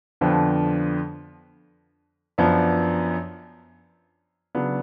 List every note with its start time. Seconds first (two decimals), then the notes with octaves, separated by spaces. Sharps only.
0.21 F2 D3 F3 B3 D4
2.38 F#2 F3 B3 D4
4.55 C#3 F#3 B3 D4